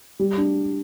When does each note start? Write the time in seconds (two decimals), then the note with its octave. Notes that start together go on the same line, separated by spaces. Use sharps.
0.19 G3
0.37 D4